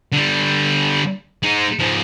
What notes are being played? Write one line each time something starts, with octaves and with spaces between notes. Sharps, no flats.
D3 G3
G#3 D#4
G#2 F3